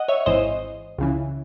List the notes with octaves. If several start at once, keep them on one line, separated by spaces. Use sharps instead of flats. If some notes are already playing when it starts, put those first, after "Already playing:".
Already playing: D#5 F#5
C#5 E5
G#1 G#2 E3 C5 D#5
C#2 C#3 E3